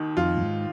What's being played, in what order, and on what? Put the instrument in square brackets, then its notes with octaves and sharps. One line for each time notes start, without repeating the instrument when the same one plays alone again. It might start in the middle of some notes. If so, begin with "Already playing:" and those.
Already playing: [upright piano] D#2 D#3
[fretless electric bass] F2 [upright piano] F4
[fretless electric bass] A#2
G#2